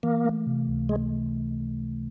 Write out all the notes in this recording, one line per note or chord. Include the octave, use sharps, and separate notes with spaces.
E3 A#3
A3
C3
C#2
G#3 A3